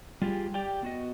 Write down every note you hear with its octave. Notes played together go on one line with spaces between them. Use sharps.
G3 F4 G4 G#4
G4 D5 G5
B3 F#4 D#5